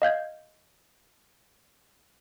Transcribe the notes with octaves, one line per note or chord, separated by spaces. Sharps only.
D#5 F5 G6 G#6